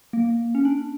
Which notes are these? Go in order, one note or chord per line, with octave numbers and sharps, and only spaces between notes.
A#3
C#4
D4